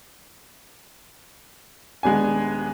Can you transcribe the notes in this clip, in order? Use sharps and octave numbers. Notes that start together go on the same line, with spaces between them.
D#1 G#3 B3 D4 G#5